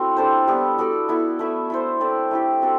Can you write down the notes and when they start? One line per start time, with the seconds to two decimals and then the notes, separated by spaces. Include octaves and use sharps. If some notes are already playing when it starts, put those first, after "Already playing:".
Already playing: A3 C4 E4 F#4
0.17 G3 D4 A4 C5
0.47 G3 B3 E4
0.78 B3 F#4 A4 D5
1.08 B3 E4 A4
1.39 A3 E4 B4 E5
1.70 E4 A4 C5
2.01 C4 E4 A4 D5
2.31 A3 E4 G4
2.62 C4 F#4 A4